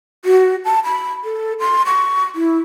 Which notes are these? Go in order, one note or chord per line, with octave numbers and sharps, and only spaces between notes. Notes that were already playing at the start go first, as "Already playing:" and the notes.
F#4
A5
B5
A4
C6
C#6
E4